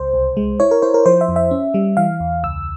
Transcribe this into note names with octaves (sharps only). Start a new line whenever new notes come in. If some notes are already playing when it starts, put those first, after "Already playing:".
Already playing: C#2 C5
C2
G#3
E4 C#5
A#4
E4 C5
A#4
F3 C5
E5
F2
E5
C#4
G3
E3 F5
E2
C#2 E6